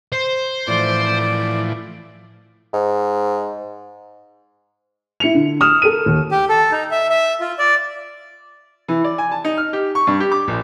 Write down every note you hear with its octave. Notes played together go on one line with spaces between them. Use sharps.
C5
A2 E3 F3 D5
G#2
E4 C#7 F7
D3
D#6 F6 E7
A4 A#4 D#7
D#2
G4
A4
D#4
E5
E5
F4
D5
E3
D5
G#5
A5
D#4
F6
G4
C#6
G2
G4
D6
A#1